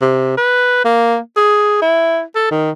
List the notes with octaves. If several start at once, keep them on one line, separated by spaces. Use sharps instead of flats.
C3
B4
A#3
G#4
E4
A4
D#3